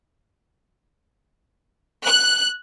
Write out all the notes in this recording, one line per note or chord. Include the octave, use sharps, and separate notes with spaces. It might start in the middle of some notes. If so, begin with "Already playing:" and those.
F#6